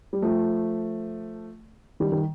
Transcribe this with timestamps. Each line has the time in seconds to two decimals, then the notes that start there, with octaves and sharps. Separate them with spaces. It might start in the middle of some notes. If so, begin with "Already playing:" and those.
0.13 G3
0.22 F3 A3
2.00 D#3 G3
2.12 D#3